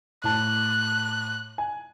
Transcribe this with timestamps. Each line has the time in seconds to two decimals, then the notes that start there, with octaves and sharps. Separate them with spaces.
0.24 A2 A5 F#6
1.58 G#5